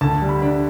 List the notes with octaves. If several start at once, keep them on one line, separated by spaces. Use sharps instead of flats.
D2 A5
G3
B5
D4